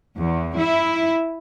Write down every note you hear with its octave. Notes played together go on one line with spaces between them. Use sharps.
E2
E4